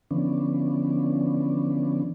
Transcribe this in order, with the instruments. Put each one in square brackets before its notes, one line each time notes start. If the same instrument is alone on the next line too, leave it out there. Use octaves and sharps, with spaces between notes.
[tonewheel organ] D3 E3 F3 B3 C#4 D4